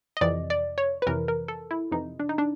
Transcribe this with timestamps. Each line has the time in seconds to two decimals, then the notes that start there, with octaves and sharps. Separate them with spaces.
0.17 D#5
0.21 F2 C3 E3 D5
0.50 D5
0.78 C#5
1.02 B4
1.07 F2 C3 E3 A#4
1.28 A#4
1.48 A4
1.71 E4
1.91 F2 C3 E3 D#4
2.19 D4
2.29 D#4
2.38 D4